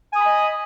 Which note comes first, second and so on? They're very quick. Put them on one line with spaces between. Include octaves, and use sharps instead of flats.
G#5 D#6 B5 D#5